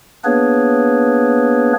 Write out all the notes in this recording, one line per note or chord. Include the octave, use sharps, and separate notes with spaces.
A#3 B3 D4 G#4 B4 C#5